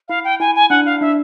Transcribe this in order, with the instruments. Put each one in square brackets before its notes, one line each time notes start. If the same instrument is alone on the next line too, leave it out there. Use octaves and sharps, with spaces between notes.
[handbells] E4 [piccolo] F5
[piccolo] G5
[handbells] E4 [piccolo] G#5
[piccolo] G#5
[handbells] D4 [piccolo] F#5
[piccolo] F5
[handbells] D4 [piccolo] E5